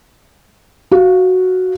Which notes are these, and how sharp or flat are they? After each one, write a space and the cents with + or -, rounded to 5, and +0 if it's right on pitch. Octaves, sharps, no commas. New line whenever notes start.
F#4 +0 F5 +0